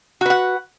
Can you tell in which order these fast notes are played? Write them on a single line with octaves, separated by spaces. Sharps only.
F#4 B4 F#5